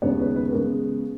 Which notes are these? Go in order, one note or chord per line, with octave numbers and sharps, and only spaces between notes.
D#2 C#3 G#3 B3 C#5
B4
B4
C#3 G#3 B3 A#4